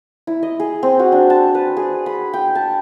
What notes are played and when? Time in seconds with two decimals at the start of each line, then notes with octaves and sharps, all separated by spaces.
0.27 E4
0.43 D#5
0.60 G#4
0.83 C4
0.99 F#4
1.12 D4
1.30 A5
1.55 B4
1.77 G#4
2.06 B5
2.33 G5
2.55 A5